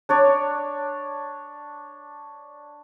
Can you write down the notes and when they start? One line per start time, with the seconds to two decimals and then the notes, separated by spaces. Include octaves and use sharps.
0.09 D4 C#5 D5